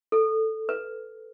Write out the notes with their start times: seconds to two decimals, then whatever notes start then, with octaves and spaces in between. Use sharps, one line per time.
0.12 A4
0.69 B4